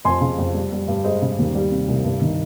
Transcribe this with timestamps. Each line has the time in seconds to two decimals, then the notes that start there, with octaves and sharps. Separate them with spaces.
0.05 F2 G#5 C6
0.21 C#3
0.38 F2
0.55 G3
0.72 G3
0.88 G2
1.04 G#3 C5 D#5
1.22 C#3
1.38 D#2
1.55 G3
1.71 C3
1.88 C2
2.04 G2
2.22 D#3